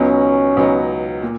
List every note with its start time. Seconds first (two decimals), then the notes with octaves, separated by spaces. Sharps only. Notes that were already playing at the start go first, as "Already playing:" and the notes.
Already playing: C#2 B2 F#3 B3 C#4 D#4
0.57 C#2 B2 F#3 B3 D#4
1.22 A#2